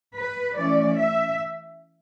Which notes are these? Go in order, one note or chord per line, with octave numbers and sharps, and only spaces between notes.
B4
E3 A3 C#4 D5
E5